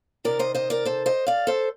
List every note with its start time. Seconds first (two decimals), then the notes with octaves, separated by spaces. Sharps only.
0.24 C3 D#3 A#4 D5
0.39 C5 D#5
0.55 C5 D#5
0.70 A#4 D5
0.85 A4 C5
1.06 C5 D#5
1.27 D5 F5
1.47 A4 C5